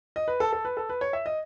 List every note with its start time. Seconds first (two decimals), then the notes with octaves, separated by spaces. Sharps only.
0.16 D#5
0.28 B4
0.40 A4
0.53 A4
0.65 B4
0.77 A4
0.90 B4
1.01 C#5
1.13 E5
1.26 D#5